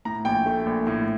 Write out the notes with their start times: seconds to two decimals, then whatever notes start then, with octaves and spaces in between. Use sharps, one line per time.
0.05 A2 A#5
0.25 A#1 G5
0.46 A3
0.66 A#1
0.87 A2